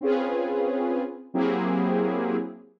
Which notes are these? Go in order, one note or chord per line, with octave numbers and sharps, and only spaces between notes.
C4 C#4 F4 G#4 B4
F#3 A#3 C4 E4 G4 G#4